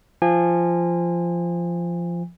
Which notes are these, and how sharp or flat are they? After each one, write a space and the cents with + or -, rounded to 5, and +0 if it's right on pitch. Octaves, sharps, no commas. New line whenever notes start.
F3 -15 G#5 -30